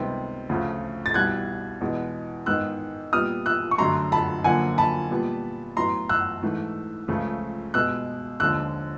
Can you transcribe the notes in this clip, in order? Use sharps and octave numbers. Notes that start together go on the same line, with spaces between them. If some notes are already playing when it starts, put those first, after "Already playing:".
Already playing: C#2 C3 D#3 G3 B3
D2 C#3 F3 A3
A6
C2 B2 G3 F#6 G#6
E2 B2 G#3 B3
G#2 D#3 G#3 B3 E6 F#6
A#2 G3 B3 D#6 F6
E6 F#6
C#6
F#2 D3 F#3 A3 A#5 C6
A5 B5
F#2 D3 F3 A#3 F#5 G#5
A5 B5
A#2 G3 B3
A2 F#3 B3 A#5 C6
E6 F#6
G#2 E3 A3
C#2 C#3 F3 A3
B2 G#3 B3 E6 F#6
D#2 D3 F3 G#3 E6 F#6